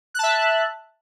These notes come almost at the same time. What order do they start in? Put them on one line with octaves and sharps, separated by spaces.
F#6 A5 E5